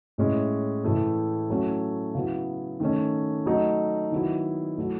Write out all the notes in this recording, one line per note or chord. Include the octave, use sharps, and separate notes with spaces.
A2 G#3 C#4 E4
A2 E3 A3 E4
F#3 A3 C#4 E4
C#3 F#3 B3 E4
D#3 A3 C#4
F#3 A3 D#4
D#3 F#3 B3 E4
F#3 A3 E4